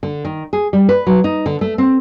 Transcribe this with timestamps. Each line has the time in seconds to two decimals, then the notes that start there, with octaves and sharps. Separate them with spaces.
0.03 D3
0.25 D#3
0.53 G#4
0.73 G3
0.89 B4
1.07 F#3
1.24 D#4
1.46 D3
1.61 A3
1.78 C4